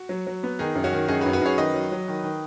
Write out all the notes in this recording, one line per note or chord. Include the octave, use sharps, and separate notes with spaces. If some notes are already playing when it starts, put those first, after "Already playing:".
Already playing: F#4
F#3
F#3
B3
D#3 D#4 G#4
F#2
C#4 F#4
D#3
F#2 D#4 G#4
F#4 B4
F#2
F#4 B4
F#2 G#4 C#5
D#3 B4 D#5
F#3
F#3
D#3
D#3